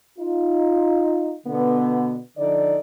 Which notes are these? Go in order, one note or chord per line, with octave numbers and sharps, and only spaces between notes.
D#4 F4
B2 D3 B3
D3 F3 D#4 A4 D5